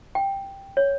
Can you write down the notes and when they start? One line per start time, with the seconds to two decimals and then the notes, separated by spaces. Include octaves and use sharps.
0.15 G5
0.77 C#5